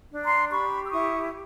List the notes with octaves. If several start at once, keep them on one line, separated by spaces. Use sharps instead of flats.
D4
A#5 C6
G4 B5 C#6
E6
E4 C#6 D#6